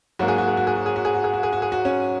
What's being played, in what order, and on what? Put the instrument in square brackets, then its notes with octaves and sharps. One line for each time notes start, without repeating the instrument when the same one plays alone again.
[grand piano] G#2 F#3 A#3 F#4
G#4
F#4
G#4
F#4
G#4
F#4
G#4
F#4
G#4
F#4
G#4
F#4
G#4
F#4
G#4
F#4
C#4